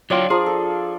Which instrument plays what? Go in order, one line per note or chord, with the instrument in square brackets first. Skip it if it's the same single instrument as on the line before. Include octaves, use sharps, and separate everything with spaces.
[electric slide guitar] F#3 C#5 G5 [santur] D4 F4 D5
[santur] F3 F4 A#5 [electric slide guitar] G#4
[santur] A4